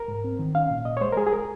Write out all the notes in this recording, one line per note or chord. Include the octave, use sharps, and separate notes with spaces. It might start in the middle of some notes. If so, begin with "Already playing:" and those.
Already playing: A#4
G#2
C4
D#3
C#4 F5
A#2
A#2 D#5
C#5
G#3 C5
A#4
G#3 G#4
G#4
A#4